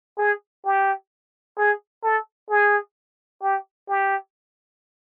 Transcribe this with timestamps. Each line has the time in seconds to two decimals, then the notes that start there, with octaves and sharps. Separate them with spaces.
0.18 G#4
0.65 G4
1.58 G#4
2.04 A4
2.50 G#4
3.42 G4
3.88 G4